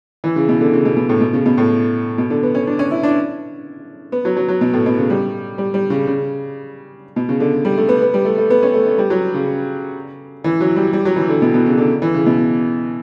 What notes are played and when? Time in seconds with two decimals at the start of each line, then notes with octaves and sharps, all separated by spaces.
0.24 E3
0.36 C#3
0.49 B2
0.61 D3
0.73 C#3
0.85 B2
0.97 B2
1.09 A2
1.21 B2
1.33 C#3
1.46 B2
1.58 A2
2.18 B2
2.30 D3
2.43 B3
2.55 C#4
2.67 D4
2.79 C#4
2.91 E4
3.03 D4
4.12 B3
4.25 F#3
4.37 F#3
4.48 F#3
4.61 B2
4.73 A2
4.86 B2
4.98 C#3
5.10 G3
5.58 G3
5.74 G3
5.90 C#3
6.07 C#3
7.16 B2
7.29 C#3
7.40 D3
7.65 G3
7.78 A3
7.89 B3
8.02 B3
8.14 G3
8.25 A3
8.38 A3
8.50 B3
8.63 C#4
8.74 A3
8.86 A3
8.98 G3
9.10 F#3
9.34 C#3
10.44 E3
10.61 F#3
10.76 G3
10.93 G3
11.05 F#3
11.16 E3
11.29 D3
11.42 B2
11.54 B2
11.66 C#3
11.78 D3
12.02 E3
12.14 C#3
12.26 B2